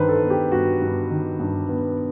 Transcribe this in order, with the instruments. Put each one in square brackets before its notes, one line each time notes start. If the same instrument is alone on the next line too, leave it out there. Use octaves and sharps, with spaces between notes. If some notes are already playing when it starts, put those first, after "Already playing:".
Already playing: [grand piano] G2 D#3 B4 C5
A4
B3
G4
G2 F#4
G2
D#3
G2
B3